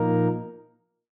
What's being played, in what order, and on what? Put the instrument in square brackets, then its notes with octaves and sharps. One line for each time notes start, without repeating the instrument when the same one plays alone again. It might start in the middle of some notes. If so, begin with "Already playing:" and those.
Already playing: [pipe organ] A#2 F3 A#3 D#4 A#4